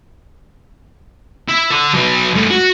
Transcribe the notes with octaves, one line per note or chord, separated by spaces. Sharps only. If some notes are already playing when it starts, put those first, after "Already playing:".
E4
A4 D5
F#3 B4
G2 A3
F#4